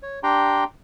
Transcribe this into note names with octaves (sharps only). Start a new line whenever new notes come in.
C#5
D4 G4 G5 A#5 C6